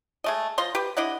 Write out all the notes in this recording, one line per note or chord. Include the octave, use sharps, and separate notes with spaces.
G#3 A3 D#5
F3 D#5 C6
G4 B4
D4 E4 D#5 F#5